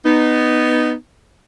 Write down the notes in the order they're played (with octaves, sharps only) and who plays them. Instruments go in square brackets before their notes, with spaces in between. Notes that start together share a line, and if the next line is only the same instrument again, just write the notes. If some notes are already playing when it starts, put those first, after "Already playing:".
[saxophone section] B3 D#4